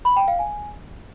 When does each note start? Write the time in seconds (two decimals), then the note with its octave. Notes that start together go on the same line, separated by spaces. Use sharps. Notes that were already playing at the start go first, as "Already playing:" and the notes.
0.05 B5
0.16 G5
0.28 F5
0.39 G#5